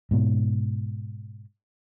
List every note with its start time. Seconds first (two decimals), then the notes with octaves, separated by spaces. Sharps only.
0.11 G#2 B2